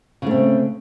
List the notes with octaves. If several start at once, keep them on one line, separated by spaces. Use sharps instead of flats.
C#3 A3 C4